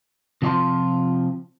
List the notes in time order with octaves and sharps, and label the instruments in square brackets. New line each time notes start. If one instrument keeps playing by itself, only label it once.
[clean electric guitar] C3 F3 F4 D5 A5 C6